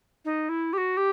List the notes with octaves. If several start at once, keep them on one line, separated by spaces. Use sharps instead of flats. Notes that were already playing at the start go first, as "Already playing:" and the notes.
D#4
E4
G4
F#4
G4